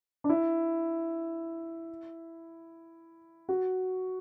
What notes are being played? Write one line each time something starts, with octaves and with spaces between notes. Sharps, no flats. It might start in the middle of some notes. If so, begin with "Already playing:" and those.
D4
E4
F#4